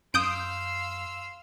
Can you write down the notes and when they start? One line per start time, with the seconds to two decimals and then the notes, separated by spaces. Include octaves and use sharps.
0.14 F#2 F5 C6 D#6 E6 G6 D7